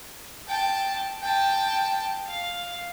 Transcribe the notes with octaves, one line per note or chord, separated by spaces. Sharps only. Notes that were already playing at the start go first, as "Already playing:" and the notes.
G5 A5
G5 A5
F5